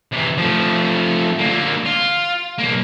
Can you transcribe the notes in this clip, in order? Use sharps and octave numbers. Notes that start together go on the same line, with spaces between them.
C3 E3
F3 A3
D3 A#3
F4
B1 A#3